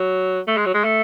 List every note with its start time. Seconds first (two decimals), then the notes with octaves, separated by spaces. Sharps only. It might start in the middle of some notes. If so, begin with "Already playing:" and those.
Already playing: F#3
0.47 A3
0.57 G#3
0.66 F#3
0.74 G#3
0.84 A3